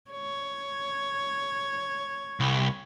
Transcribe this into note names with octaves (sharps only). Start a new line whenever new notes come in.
C#5
C2